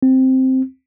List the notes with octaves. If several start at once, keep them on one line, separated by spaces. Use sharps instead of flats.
C4